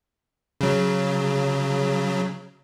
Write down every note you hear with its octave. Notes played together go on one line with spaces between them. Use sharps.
C#3 F#3